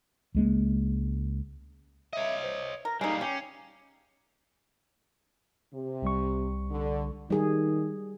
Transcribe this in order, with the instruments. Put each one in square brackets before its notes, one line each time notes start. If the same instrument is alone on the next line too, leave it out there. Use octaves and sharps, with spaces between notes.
[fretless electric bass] C#2 G#3 A#3
[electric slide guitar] C#5 D#5 [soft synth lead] E5
[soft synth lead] C5
[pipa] A#4 [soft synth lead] A#6
[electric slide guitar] G3 A#3 [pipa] G#3 D#4 [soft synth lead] C7
[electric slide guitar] C#4 [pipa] G4
[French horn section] C3
[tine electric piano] C2 G3 C#6
[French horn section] D3
[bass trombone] D#3 [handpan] G3 G#4